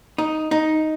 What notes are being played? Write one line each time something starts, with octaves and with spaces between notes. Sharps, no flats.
D#4
D#4